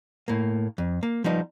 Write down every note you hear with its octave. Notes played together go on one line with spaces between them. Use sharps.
A2 A#3
F2
A#3
F3 G3 B3 D#4